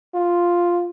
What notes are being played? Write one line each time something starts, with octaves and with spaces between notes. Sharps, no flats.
F4